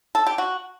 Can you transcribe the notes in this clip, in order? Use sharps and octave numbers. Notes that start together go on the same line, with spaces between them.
A4
G4
F#4